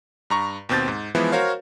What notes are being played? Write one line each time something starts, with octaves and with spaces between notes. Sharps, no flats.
G2 A#5 C#6
D#2 B2 C4 G6 A6
G#2
E3 F3 G#3 B3 E4
F#4 A#4 C5 C#5 F5